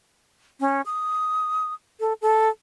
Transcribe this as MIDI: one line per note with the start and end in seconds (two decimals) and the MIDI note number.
0.60 0.81 61
0.86 1.73 87
2.00 2.13 69
2.21 2.49 69